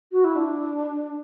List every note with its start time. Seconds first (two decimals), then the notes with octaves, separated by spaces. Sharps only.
0.12 F#4
0.24 E4
0.36 D4